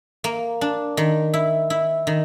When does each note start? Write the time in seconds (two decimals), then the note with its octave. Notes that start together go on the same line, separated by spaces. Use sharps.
0.24 A#3
0.61 D4
0.97 D#3
1.34 E4
1.70 E4
2.07 D#3